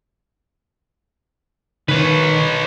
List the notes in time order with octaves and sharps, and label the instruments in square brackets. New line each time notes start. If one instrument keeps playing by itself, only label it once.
[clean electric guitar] D#3 [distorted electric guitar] B4 C#5